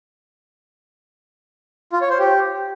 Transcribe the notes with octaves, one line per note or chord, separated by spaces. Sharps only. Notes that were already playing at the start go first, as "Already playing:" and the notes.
F4
C#5
C5
G4